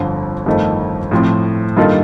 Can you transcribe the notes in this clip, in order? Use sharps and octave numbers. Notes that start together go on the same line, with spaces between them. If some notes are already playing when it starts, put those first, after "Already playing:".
Already playing: G1 F2 D3
G1 F2 D#3 A3
A2 F3 C4
G2 D#3 A#3 F4 A4